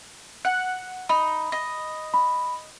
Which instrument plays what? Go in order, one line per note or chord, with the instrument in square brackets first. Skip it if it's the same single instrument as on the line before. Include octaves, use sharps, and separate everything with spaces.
[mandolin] F#5
[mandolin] D#4 [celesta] B5
[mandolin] D#5
[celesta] B5